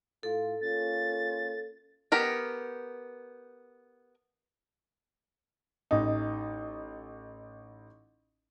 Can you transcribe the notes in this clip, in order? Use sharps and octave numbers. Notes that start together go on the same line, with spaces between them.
A2 F4 A4
A#3 C#4 F4 A6
B3 G4 A#4 G5
A1 D#4